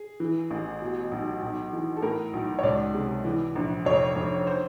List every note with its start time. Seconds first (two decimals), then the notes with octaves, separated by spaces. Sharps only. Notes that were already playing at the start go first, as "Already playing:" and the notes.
Already playing: G#4
0.20 E3
0.51 A1
0.82 B2
1.12 B1
1.43 B1
1.73 E3
1.97 A4
2.02 A2 A#4
2.33 B1
2.59 C#5
2.63 C#2 D5
2.94 C3
3.25 E3
3.55 A#1
3.85 F1 C#5
4.16 F1
4.47 C5